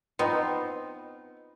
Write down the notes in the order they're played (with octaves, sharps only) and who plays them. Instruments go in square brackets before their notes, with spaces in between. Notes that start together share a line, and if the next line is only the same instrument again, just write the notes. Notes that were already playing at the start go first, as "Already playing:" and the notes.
[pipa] B3 C4 [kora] D#4 F4